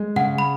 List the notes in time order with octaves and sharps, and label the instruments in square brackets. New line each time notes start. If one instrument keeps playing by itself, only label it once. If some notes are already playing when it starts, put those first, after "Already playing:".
Already playing: [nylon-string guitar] G#3
[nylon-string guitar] C#3 [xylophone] F#5
[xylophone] B5